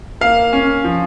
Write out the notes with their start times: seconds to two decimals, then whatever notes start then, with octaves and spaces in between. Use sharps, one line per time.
0.21 A#3 F5
0.53 C#4
0.84 F3